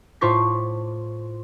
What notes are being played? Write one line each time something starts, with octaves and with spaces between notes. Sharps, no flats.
A2 F4 C5 C#6 D6 B6